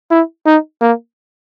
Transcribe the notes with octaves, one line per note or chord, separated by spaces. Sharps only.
E4
D#4
A#3